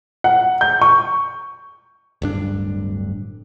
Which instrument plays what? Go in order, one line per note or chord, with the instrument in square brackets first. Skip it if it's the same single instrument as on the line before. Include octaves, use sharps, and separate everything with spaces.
[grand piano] F#5
G6
C#6
[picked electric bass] D1 G2 D4